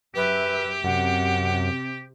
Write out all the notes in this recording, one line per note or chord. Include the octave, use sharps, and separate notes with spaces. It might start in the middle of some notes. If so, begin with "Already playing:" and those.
F#2 G4 B4 E5
F#2 C3 F#5